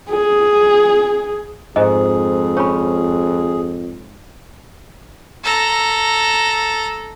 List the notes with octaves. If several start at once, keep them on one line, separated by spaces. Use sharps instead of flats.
G#4
F2 G#2 G#4 D#5
C#4 C#5 B5
A4 A#5